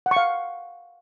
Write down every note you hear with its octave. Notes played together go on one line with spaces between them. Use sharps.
F#5
C#6
F5